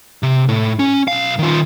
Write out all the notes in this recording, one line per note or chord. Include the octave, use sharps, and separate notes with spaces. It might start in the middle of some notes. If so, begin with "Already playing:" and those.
C3
A2
C#4
B1 F5
D#3 F4